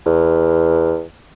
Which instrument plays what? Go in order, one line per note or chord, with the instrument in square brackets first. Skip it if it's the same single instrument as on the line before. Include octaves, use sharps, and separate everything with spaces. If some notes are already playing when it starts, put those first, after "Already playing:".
[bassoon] E2